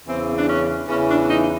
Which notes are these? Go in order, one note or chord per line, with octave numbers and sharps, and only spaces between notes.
E2 C#3 E3 C4
D4
C#4
E2 C#3 E3 C#4
D4
D#4